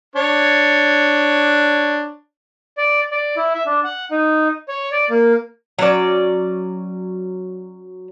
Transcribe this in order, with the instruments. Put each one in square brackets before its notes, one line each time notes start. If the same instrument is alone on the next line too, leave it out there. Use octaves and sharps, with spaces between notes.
[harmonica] D4 C#5
[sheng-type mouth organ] D5
D5
E4
E5
D4
F#5
D#4
C#5
D5
A#3
[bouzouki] F#3 C#4 D5